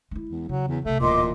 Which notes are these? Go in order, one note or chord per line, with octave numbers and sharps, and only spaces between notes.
G#3 E4
E2
C#3 F#3
E2
A#1 C3 A3
D1 A#2 E3 D#5 C6 D6